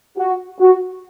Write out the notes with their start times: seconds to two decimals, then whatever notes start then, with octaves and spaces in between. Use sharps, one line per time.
0.18 F#4
0.60 F#4